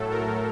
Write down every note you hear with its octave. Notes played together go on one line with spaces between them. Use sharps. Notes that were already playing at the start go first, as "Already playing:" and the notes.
Already playing: A2 F#3 A3 A4
A#4